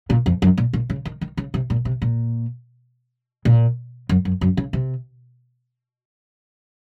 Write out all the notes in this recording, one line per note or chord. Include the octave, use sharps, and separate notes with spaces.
A#2
F2
F#2
A#2
A#2
C#3
D#3
D#3
C#3
C3
A#2
C3
A#2
A#2
F#2
F#2
F#2
C#3
C3